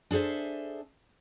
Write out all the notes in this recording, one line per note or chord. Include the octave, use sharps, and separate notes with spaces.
D4 G#4 A4 C5 E5